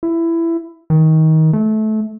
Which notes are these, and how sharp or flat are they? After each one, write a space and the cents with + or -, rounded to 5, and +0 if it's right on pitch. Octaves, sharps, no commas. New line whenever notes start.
E4 +15
D#3 +25
A3 -20